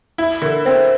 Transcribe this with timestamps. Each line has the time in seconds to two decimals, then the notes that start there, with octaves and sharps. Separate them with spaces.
0.18 E4
0.42 D3 A#4
0.65 C4 C5